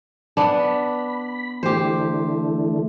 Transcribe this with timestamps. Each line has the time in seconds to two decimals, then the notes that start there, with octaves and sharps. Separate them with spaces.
0.37 B3 D4
0.58 B5
1.63 D3 E3 A3 G4 C5